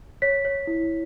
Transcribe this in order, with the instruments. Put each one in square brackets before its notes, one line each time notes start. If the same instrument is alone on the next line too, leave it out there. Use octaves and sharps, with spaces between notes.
[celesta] C#5 B6
C#5
E4